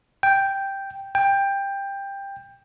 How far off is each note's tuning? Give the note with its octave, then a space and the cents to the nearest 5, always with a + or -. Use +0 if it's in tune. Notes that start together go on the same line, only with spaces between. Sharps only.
G5 +0
G5 +15